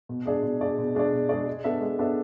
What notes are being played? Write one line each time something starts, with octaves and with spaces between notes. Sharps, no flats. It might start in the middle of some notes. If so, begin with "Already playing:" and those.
B2
G#3 D4 G#4 D5
B2
G#3 D4 G#4 D5
B2
G#3 D4 G#4 D5
B2
G#3 D4 G#4 D5
G#3
B3 D4 A4 E5
G#3
B3 D4 A4 E5